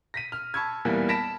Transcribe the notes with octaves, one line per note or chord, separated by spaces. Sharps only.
A#6 B6 D#7
F6
A5 B5 C#6 E6 G#6
E2 A#2 E3 G3 A#3 B3
A5 B5 A#6 B6 D7 E7